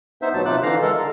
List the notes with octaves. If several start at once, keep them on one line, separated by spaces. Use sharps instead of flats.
B3 D#4 C5 E5
D#2 B2 F#3 A5
C3 D#4 F4 D6 F#6
D3 E3 F5 A#5
G#3 A4 A#4
D3